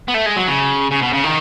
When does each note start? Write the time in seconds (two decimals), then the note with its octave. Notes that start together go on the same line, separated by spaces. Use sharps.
0.08 B3
0.14 A3
0.26 G#3
0.36 F#3
0.48 C#3
0.91 C#3
1.02 B2
1.13 C#3
1.24 D#3